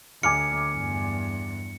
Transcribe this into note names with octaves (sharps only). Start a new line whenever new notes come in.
D2 G#5 D6 F6 C#7
E2 G2